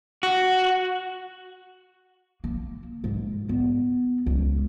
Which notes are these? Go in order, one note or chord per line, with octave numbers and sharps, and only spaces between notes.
F#4
A#3
G#2
B3
C#2